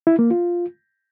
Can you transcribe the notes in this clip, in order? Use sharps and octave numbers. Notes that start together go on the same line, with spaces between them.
E4
A#3
F4